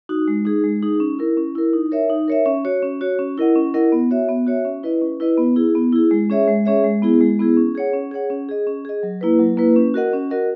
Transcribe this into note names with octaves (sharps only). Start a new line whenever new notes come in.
D#4 F#4
G#3
D#4 G#4
G#3
D#4 G#4
C#4
E4 A#4
C#4
E4 A#4
D#4
A#4 C#5 E5
D#4
A#4 C#5 E5
C#4
F#4 C#5
C#4
F#4 C#5
C#4
E4 A#4 D#5 F#5
C#4
E4 A#4 D#5 F#5
B3
F#4 C#5 E5
B3
F#4 C#5 E5
C#4
E4 B4 D#5
C#4
E4 B4 D#5
B3
E4 G#4
B3
E4 G#4
G#3
C#4 G#4 C#5 E5
G#3
C#4 G#4 C#5 E5
G#3
B3 E4 G#4
G#3
B3 E4 G#4
C#4
G#4 C#5 F#5
C#4
G#4 C#5 F#5
C#4
G#4 D#5
C#4
G#4 D#5
F#3
A#3 E4 B4
F#3
A#3 E4 B4
C#4
F#4 A#4 D#5 F#5
C#4
F#4 A#4 D#5 F#5